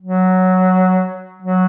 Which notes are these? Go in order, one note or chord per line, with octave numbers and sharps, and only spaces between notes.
F#3
F#3